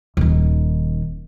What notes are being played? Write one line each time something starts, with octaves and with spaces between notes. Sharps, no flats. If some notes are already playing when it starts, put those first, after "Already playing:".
D#1 D#3